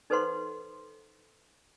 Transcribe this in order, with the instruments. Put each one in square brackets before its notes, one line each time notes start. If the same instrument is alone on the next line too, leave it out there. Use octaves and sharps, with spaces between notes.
[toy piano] D#4 A4 B4 C5 F#5 C6